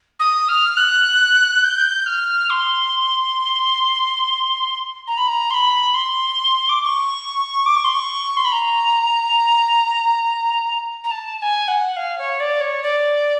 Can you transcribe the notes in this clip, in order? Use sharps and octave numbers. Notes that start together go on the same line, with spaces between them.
D#6
F6
F#6
G6
F6
C6
A#5
B5
A#5
C6
B5
C6
D6
D6
C#6
D6
C#6
C6
C#6
C6
B5
A#5
A#5
A5
A5
G#5
F#5
F5
C#5
D5
C#5
D5